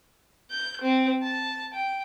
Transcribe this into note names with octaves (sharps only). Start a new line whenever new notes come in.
G6
C4
A5
G5